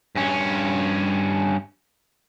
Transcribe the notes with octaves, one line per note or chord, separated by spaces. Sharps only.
G2 C#4